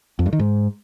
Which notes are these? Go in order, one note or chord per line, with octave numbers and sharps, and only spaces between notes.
F2
G2
D#3
G#2